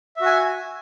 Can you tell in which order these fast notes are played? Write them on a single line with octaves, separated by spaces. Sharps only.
E5 F#4 G#5